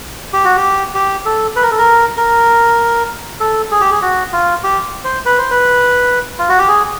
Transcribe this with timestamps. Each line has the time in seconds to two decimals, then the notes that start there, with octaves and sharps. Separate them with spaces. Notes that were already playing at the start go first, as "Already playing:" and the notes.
0.33 G4
0.45 F#4
0.57 G4
0.94 G4
1.26 A4
1.56 B4
1.63 A#4
1.71 A4
1.78 A#4
2.17 A#4
3.40 A4
3.72 G#4
3.81 G4
3.91 G#4
4.02 F#4
4.33 F4
4.64 G4
5.04 C5
5.26 B4
5.38 C5
5.51 B4
6.39 F4
6.49 F#4
6.59 G4
6.68 G#4